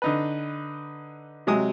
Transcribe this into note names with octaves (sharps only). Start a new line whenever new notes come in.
D3 D#4 B4
C3 F#3 G#3 G#5 D#6